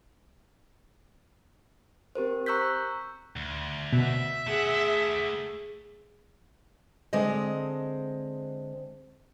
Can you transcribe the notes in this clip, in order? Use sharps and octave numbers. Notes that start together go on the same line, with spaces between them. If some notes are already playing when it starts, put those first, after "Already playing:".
C4 G4 A#4 C5
A#5 C#6 E6 F#6 G6 B6
D2
B2 E5
A3 G#4 F#5
D3 G#3 C4 D#5